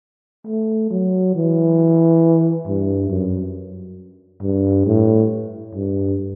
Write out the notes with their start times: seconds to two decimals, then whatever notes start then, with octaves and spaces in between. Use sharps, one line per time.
0.47 A3
0.91 F#3
1.35 E3
2.67 G2
3.10 F#2
4.42 G2
4.86 A2
5.75 G2